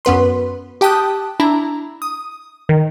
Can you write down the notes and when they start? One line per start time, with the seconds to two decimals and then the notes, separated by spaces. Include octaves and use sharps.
0.05 F#2 B3 B4 C6
0.81 G4 G5 A5 D#6 F#6
1.40 D4 E4 A#5
2.02 D#6
2.69 D#3